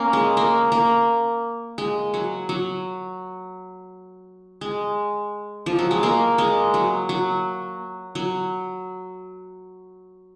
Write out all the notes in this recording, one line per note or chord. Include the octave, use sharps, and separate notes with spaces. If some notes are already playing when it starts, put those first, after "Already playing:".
Already playing: A#3 C#4
G#3
A#3
A#3
G#3
F#3
F#3
G#3
F3
F#3
G#3
A#3
G#3
F#3
F#3
F#3